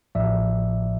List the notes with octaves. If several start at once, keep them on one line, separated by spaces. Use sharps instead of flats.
A1 A2 F3 D5 E5